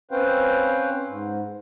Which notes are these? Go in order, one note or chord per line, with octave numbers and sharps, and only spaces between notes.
C4 C#4 B4 C5 F5 G5
G#2